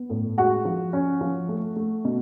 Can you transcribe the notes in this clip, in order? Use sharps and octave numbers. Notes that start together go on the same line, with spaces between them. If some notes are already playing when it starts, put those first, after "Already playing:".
Already playing: B3
A2
G#3 F#4 F#5
F3
C#4
F3
A3
A3
B2